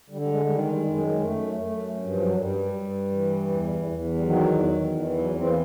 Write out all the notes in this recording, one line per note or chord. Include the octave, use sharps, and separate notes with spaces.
D3 G3
G3
G#3
D#3 G3
G#3
G3
F#2 G#3
F#2 A3
F#2 A3
G2
F3
F#3
G2 G3
G2
E3
E2
E2
G3
D#3 F#3
E2
E3
F#3
E3 C4
A#3